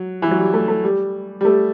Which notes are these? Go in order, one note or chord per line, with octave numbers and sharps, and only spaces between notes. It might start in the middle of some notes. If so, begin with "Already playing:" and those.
Already playing: F#3
E3
F#3
G3
A3
A3
G3
G3
A3